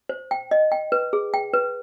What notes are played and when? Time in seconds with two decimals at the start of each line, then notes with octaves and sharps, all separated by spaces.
0.09 C5
0.31 G5
0.51 D#5
0.72 G5
0.92 B4
1.13 G#4
1.34 G5
1.54 B4